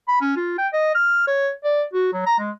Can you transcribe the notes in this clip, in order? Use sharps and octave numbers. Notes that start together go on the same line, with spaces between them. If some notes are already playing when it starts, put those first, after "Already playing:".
B5
C#4
F4
G5
D#5
F6
C#5
D5
F#4
F#3
A#5
G#3